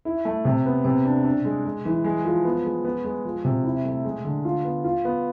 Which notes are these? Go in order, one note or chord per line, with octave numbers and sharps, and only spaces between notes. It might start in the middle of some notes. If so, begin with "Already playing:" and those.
E4
A3
C3
B3
C3
D4
D4
G#3
G#3
E3
G#3
F3
B3
G#3
B3
G#3
F3
C3
E4
A3
G#3
D3
F4
B3
F4
B3